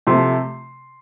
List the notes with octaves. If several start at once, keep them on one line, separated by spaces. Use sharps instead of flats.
C3 F3 A3 C6